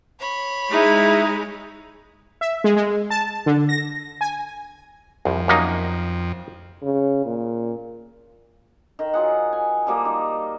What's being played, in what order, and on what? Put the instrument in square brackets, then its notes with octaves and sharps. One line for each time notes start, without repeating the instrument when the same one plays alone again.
[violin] C#5 B5
[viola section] G#3 [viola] D#4 [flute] E4
[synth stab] E5
G#3
G#3
A5
D3
A#6
G#5
[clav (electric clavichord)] C2 [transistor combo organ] F2
[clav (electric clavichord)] F#2 A#3 D#4
[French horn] C#3
A#2
[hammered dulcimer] D#3
F#3 F4 G#4 F#5
G#5
F3 G3 A#3 D#5
D#4